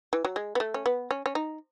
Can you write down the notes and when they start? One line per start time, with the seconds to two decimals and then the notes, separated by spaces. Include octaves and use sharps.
0.13 E3
0.25 F#3
0.36 G#3
0.55 B3
0.60 A3
0.74 C#4
0.86 B3
1.11 C#4
1.26 C#4
1.35 D#4